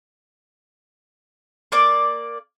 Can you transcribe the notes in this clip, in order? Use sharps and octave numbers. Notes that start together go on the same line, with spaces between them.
A#3 D5 D6